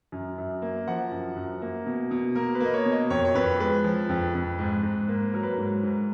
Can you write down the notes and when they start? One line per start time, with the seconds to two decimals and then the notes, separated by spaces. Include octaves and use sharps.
0.12 F#2
0.38 F#2
0.62 A#3
0.87 F3 F#5
1.12 F#2
1.36 F#2
1.62 A#3
1.86 B2
2.11 B2
2.35 A#3 A#4
2.55 B4
2.60 A#3 D#5
2.74 C#5
2.85 B2
2.92 D#5
3.10 F2 C#5
3.25 C#5
3.35 F2 B4
3.60 G#3 B4
3.84 F3
4.09 F2
4.34 F2
4.59 G#2
4.83 G#2
5.08 A#3
5.34 F#3 A#4
5.43 B4
5.53 G#2 A#4
5.83 G#2